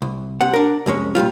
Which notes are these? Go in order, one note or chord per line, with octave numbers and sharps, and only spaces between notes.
C2
C2 C3 F#5
D4 A#4
C2 F2 G#3 C#4
A#2 C#3 G3 F4